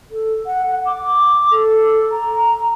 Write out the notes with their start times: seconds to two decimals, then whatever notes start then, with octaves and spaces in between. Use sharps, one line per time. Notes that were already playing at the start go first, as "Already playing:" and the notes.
0.11 A4
0.46 F#5
0.69 F#5
0.86 D6
1.51 A4
2.11 A#5